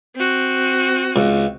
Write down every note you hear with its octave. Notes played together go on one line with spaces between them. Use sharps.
C4 F#4
C#2